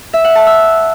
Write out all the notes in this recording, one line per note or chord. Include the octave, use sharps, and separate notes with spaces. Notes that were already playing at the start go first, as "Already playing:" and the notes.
E5
F#5
A5
E6